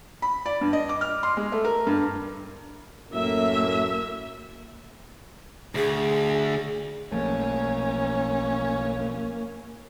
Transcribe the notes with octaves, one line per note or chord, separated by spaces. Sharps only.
B5
D5
G2
D#5
D6
F6
C6
G#3
A3
A#4
G2
F#2 A2 A#3 E5
D2 G#4
B1 F3 A3 A#3 C#4